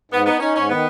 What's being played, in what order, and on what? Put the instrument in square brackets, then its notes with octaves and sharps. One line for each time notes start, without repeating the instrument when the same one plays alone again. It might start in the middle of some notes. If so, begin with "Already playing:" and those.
[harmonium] G#2 [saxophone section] B3
[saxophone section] B3 [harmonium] D#4
[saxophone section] C#4 [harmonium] D#4
[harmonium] G#2 [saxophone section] C#4
[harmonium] D#3 [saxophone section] B3